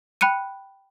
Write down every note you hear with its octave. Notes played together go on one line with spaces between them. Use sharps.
G5 B5 F#6 C#7 D#7